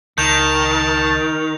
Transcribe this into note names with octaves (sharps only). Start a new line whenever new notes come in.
C#2 D#3 A5 G6 F7